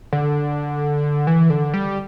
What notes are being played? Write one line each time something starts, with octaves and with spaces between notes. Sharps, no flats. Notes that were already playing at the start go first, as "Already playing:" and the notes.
D3
E3
D3
G3